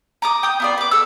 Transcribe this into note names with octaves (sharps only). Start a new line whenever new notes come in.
A#5 D6 D#6
G5 D#6
B3 F4 D5
B4 D6
A4 E6